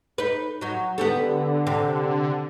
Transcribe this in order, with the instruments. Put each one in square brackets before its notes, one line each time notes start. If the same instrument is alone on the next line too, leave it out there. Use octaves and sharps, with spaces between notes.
[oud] D#4 B4
F#3 D#4
[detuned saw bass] D3 [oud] B3 G4 A4
[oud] C3